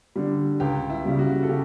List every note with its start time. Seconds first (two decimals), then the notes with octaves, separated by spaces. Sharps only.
0.16 D3 G3
0.60 C#2 G4
0.90 E4
1.05 C#3 G3
1.19 F#4
1.43 A4
1.49 C#3 G4